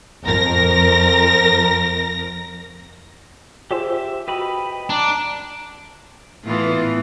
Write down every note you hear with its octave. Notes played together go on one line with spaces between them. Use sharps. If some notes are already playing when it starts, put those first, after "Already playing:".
F2 A#4 A#6
F4 G4 G#4 C5 E5
F#4 B4 D#5 G5 B5
D4 A#5
A2 E3 B3 F4